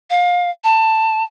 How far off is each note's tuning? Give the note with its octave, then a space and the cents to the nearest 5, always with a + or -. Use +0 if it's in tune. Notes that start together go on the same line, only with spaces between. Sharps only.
F5 +25
A5 +15